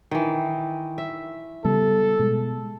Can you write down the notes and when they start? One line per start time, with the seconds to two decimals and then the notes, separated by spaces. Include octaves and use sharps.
0.11 D#3 E3
0.98 E5
1.64 C#3 G3 B3 A4
2.19 B2 G#3